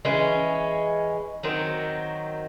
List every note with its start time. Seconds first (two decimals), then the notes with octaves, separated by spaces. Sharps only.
0.05 E3 G#3 C#4
1.43 D#3 F#3 C4